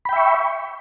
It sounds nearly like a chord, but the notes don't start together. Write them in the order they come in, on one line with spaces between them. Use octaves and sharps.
B5 G5 E5 C#6